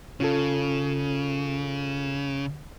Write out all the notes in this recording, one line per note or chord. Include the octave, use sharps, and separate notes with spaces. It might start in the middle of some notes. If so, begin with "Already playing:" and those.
C#3 C#4 F4 A4